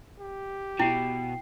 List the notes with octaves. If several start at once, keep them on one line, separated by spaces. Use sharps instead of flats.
G4
B2 E4 G5 C7